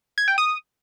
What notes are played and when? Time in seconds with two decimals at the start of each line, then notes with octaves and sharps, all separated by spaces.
0.18 G#6
0.28 G5
0.38 D#6